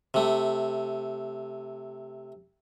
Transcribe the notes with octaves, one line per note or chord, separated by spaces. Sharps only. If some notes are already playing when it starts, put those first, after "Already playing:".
C3 A3